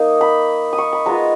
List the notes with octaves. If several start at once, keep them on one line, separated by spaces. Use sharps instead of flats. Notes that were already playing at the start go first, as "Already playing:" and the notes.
Already playing: A#3 D#4
B5
D#6
C#6
B5
G#3 B3 F4 A#5